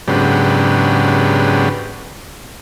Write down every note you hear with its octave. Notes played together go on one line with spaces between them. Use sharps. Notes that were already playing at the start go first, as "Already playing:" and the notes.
G#2 C#3 F#3 B3 D4 G4